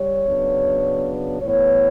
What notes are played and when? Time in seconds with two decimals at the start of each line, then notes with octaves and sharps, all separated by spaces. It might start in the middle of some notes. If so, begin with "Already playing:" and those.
Already playing: G3 C#5
0.27 C#3 F#3 B3 D4
1.41 A2 E3 B3 C#5